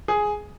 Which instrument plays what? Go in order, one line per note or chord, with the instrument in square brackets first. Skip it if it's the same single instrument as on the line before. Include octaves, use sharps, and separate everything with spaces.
[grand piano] G#4